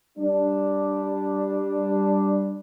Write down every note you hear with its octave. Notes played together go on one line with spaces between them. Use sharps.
G3 D4